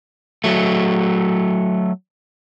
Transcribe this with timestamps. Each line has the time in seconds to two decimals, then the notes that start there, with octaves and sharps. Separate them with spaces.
0.44 F#3 A3